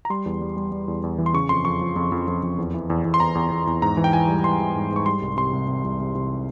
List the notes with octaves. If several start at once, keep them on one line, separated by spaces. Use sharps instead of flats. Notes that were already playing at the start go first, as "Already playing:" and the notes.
A#5
G3 C6
E2
G3
G3
G3
E2
E2
E3
C6
C#3 C#6
F2 C6
F2 C#6
F3
F2
F2
F2
F2
E2
E3
E2
E2
C6
E2 A#5
E2
E2
E2
G#2 A#5
E3
G5
E3 G#5
G3
E3 C6
E3
G#2
G#2 C#6
G3 C6
C2
C3 C6
C2
C3
C2
C3
C3